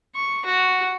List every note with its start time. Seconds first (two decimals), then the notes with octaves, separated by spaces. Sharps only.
0.15 C#6
0.45 F#4